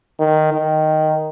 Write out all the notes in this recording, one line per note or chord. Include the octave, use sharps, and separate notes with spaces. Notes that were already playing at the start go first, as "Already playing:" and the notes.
D#3
D#3